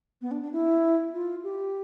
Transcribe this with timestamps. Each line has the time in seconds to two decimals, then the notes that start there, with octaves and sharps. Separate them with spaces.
0.21 B3
0.31 D4
0.42 D4
0.52 E4
1.14 F4
1.44 G4